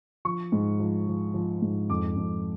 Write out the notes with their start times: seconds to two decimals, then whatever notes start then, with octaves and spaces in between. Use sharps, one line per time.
0.25 F3 C#6
0.52 G#2
0.79 F3
1.08 F3
1.34 F3
1.62 G#2
1.90 F2 D6
2.17 F2